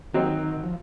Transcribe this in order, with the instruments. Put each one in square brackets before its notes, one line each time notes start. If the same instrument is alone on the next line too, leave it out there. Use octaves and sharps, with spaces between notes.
[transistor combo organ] D#3 [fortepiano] F#3 C4 D#4
[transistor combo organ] F3